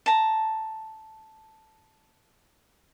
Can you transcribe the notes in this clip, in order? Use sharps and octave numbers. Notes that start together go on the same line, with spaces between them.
A5 A#5